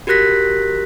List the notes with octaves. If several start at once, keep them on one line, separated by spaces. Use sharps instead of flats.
F#4 G4 A#4 F#6 A#6 B6